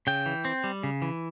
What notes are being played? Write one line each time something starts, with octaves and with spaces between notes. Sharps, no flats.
C#3 G5
E3
C4
G3
C#3
E3